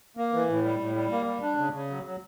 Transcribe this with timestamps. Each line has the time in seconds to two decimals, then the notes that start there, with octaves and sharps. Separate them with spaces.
0.17 A#3
0.33 E3
0.49 A2
0.64 G3
0.80 A2
0.95 G3
1.11 A#3
1.27 G3
1.42 D4
1.57 C#3
1.73 C#3
1.90 F#3
2.05 F#3